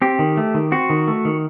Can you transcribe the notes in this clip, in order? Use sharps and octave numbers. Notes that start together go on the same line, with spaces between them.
C4 G4
D#3
A3
D#3
C4 F#4
D#3
A3
D#3